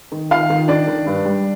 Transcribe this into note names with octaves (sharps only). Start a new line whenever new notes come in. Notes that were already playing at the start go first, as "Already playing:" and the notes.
D#3
D#3 F4 F5
D#3
D#3 D4 D5
D#3
G2
G3